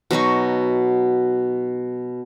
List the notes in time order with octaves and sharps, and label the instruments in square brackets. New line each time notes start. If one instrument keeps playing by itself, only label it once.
[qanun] B2 F#3 D#4 C#6